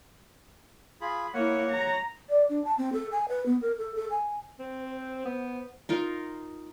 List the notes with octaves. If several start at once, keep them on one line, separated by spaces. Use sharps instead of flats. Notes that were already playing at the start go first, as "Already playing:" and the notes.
F4 G#4 B5
A#3 E4 C#5 F#5
A#5
D5
D4
A5
C4
A4
G#5
B4
B3
A#4
A4
A4
G#5
C4
C5
B3
D#4 F4 A#4